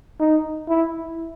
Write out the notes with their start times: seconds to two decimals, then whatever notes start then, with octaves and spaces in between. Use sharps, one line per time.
0.20 D#4
0.69 E4